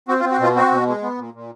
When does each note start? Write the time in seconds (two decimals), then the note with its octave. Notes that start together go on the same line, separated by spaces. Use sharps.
0.08 C4 F#4
0.20 F4
0.25 C4
0.32 F#4
0.40 B2 F4
0.56 C4 F#4
0.72 B2
0.87 G#3
1.03 B3
1.18 A#2
1.34 A#2